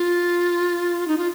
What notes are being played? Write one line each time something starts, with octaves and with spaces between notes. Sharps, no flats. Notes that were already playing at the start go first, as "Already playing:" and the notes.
Already playing: F4
D#4
F4